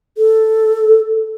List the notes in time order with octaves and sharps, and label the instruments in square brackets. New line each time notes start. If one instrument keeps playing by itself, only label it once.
[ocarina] A4